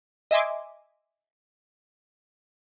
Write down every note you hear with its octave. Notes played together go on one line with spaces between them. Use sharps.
D#5 E5 G#5 C6 D6